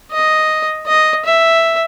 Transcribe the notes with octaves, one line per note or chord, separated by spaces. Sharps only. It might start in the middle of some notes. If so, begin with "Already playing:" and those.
D#5
D#5
E5